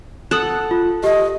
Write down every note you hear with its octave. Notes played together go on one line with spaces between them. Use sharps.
A4 F#5 D#6 F#6
F4
G4 D#5